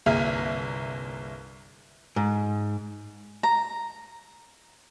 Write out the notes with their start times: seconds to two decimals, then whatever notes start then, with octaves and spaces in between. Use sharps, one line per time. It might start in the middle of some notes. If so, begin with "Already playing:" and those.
0.06 G1 C2 A#3 G#4 E5 F6
2.16 G#2
3.43 A#5